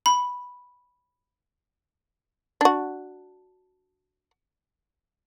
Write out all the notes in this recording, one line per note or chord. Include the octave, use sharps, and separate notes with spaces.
B5
D4 F#4